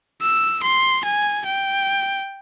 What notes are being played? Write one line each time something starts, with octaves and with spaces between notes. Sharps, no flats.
E6
C6
G#5
G5